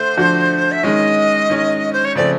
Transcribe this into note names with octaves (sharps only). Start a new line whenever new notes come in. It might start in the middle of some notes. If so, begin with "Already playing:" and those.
Already playing: D3 A3 D4 C5
D3 F3 A3 D4 F#4
E5
D#3 G#3 C#4 D#5
D#3 G#3 C#4
C5
C#5
C#3 F3 A3 C4 D5